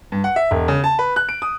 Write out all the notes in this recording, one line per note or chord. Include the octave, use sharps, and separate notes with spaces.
G2
F#5
E5
E1
C#3
A5
B4
F#6
D7
D#6